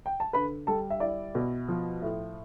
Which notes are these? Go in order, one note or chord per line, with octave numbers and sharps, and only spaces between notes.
G5
A5
D3 B4 B5
G3 A4 A5
E5
E4 D5
B2
F3
A2